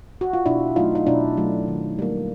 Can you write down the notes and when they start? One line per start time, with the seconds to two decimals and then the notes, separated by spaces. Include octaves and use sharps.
0.21 F#4
0.33 F4
0.46 B2 D4 E4
0.76 F#3 A3 D#4 F4
0.95 D#4
1.06 B2 D4 E4
1.37 F#3 A3
1.68 D#3
1.99 G3 A#3